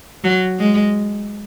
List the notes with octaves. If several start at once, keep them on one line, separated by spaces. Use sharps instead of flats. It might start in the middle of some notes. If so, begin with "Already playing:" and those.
F#3
G#3